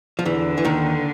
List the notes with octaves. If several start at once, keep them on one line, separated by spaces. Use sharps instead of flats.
F3
E2 D3 E3
E3
D#2 D#3